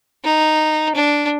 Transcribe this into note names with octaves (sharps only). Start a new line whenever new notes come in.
D#4
D4